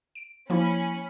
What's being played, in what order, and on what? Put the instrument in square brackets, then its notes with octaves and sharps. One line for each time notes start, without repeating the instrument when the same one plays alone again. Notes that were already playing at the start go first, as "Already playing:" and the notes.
[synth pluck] D7
[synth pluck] F3 A#3 E4 [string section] C#4 B5